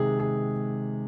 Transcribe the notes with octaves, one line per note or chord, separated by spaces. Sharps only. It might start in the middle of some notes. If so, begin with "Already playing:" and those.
Already playing: C3 D#3 G#3 G#4
G#4